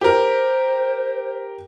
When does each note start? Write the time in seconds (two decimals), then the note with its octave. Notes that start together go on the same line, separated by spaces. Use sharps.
0.01 G4 A#4 C5